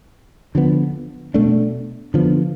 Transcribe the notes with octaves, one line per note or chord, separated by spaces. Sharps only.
D3 F3 B3
B2 A3 D4
D3 F3 B3